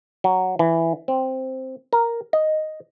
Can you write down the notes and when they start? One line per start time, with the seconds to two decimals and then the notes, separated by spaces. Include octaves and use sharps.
0.24 F#3
0.59 E3
1.08 C4
1.93 A#4
2.33 D#5